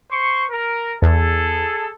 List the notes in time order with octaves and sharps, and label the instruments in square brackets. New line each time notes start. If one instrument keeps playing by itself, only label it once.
[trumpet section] C5 C#6
A#4
[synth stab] E2 [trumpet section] G#4 A4